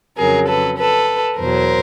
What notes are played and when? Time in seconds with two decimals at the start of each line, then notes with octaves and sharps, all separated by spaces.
0.17 F2 C#3 F#3 G#4 A#4
0.48 A4 B4
0.78 A4 B4
1.39 E2 B2 F#3 A#4 C5